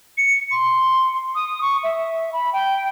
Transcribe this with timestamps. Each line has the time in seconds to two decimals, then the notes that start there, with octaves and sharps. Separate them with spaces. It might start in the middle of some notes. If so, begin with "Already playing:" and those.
0.18 C#7
0.51 C6
1.35 D#6
1.61 C#6
1.83 E5
2.33 B5
2.53 G5